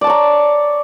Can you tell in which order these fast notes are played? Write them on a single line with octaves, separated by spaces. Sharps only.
D5 A5 C#5 A#5